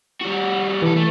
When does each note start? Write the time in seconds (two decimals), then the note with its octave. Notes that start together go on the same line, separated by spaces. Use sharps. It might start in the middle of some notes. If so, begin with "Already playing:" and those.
0.21 G3 F#4
0.82 C2 E3 A4
0.97 A3